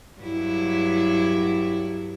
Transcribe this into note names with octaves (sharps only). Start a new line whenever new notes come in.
G2 F#3 E4